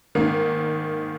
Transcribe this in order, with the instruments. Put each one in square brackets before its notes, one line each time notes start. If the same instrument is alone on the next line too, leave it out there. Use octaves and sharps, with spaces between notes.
[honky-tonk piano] G#2 D#3 A#3